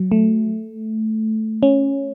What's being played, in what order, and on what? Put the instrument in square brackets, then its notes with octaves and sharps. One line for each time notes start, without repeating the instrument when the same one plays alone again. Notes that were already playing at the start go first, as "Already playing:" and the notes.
Already playing: [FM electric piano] F#3
A3
C#4